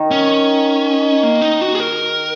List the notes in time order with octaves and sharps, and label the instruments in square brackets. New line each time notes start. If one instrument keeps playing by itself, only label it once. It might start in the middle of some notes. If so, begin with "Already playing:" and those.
Already playing: [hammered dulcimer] D#3
[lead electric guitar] C#4
A#3
D#4
F#4
G#4
A#4